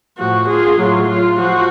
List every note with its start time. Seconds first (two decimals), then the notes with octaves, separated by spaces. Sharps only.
0.17 A2 F3 F#4
0.48 F4 G#4
0.77 A2 F#3 F4
1.08 F4
1.37 F3 F#4